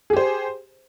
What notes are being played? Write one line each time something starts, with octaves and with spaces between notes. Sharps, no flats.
G4 G#4 C5